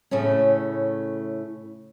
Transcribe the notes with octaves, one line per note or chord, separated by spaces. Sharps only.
A2 C#3 A3 C#4